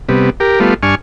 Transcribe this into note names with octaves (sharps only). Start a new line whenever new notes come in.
C3 G3 B3
G4 A#4
G3 A3 B3 F4
G2 D4 G#5 C#6 F6